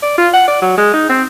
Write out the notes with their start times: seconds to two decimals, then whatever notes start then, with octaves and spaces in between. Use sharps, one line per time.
0.02 D5
0.18 F4
0.33 F#5
0.48 D5
0.62 F#3
0.77 G#3
0.93 D#4
1.09 C4